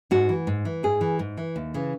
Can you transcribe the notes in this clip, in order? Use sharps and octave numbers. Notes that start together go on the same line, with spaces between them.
G#2 F#4
E3
G#2
E3
G#2 G#4
E3
G#2
E3
D#2
C#3 E3